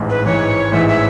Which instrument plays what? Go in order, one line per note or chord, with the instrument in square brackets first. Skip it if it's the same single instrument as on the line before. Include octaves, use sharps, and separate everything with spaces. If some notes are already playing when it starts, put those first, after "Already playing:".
Already playing: [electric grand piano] A1 G#2 E3
[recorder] B4
[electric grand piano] A1 G#2 E3 [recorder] C#5
[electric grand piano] A1 G#2 E3 [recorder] E5
[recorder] E5